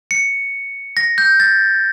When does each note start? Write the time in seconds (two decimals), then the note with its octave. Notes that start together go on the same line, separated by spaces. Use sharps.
0.11 C#7
0.97 A#6
1.18 G6
1.40 A6